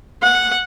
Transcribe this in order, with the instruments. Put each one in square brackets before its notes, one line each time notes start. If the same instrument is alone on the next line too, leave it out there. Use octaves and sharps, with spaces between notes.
[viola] F#5